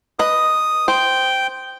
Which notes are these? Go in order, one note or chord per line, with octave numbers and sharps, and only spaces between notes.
B4 D#5 D#6
C5 G5